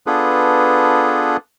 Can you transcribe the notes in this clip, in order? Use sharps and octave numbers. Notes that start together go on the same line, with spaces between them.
B3 D4 F4 G#4 A4 B4